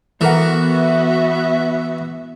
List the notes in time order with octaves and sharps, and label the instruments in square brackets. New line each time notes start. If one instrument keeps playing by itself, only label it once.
[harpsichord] E3 [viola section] B3 F#4 [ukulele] A4 A#4 F#5 [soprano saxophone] E5